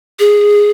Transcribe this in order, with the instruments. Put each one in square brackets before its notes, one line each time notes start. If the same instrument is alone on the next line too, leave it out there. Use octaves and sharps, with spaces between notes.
[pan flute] G#4